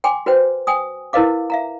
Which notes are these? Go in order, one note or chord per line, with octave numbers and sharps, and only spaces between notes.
G5 G#5 C6 D6
F#4 B4 C5 G5
G5 G#5 D#6
E4 A#4 B4 D#5 F5 D6
E5 F5 A#5